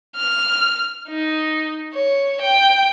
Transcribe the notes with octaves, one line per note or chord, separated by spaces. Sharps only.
F6
D#4
C#5
G5